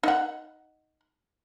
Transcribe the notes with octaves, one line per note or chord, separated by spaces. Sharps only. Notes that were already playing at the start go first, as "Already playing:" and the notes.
D#4 F#5